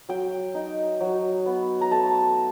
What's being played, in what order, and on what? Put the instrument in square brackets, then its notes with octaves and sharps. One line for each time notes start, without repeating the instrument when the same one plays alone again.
[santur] F#3 G5
D#4
F#3
B3
A#5
A3 A5